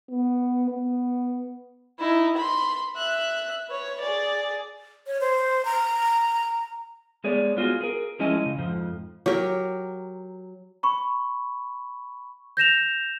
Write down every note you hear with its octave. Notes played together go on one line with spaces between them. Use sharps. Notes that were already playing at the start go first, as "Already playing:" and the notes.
B3
B3
D#4 E4
B5 C6
E5 F#6
B4 C#5
G#4 D5
C#5
C5
A#5
G#3 B3 G#4 C#5 D5
B3 F4 F#4 G#4
G#4 A#4
F3 G#3 C#4 E4 D#5 G#5
C#3
F2 G#2 F3
F#3 G4 A#4
B5 C#6
G6 A#6 E7 F7